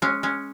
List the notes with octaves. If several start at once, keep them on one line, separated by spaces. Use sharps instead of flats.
G#3 C#4
G#3 C#4